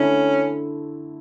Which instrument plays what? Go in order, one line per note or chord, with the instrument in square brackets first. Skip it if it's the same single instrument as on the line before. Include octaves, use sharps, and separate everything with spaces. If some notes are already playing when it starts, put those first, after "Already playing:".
Already playing: [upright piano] D3 A3 E4 [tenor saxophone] C#4